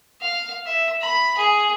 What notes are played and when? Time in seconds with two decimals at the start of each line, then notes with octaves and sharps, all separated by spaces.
0.21 F5
0.66 E5
1.01 B5
1.37 G#4